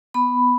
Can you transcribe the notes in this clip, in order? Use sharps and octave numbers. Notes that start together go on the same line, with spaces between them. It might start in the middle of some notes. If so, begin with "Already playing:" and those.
B3 B5